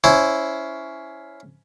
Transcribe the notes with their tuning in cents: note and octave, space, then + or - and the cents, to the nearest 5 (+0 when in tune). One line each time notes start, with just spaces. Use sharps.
C#4 +15 E4 +0 C5 +0